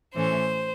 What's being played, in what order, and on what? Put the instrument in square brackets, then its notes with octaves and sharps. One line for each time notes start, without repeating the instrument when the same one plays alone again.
[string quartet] A2 E3 A3 C#4 C5